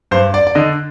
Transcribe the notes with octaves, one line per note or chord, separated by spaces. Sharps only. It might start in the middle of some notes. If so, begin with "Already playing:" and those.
G2 C5
D5
D5
D3 D#5